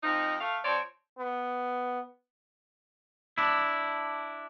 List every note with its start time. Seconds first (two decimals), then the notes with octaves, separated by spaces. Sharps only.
0.03 F2 F3 D#4
0.41 A3 F5
0.64 F3 C4 C#5 D5
1.18 B3
3.38 D4 E4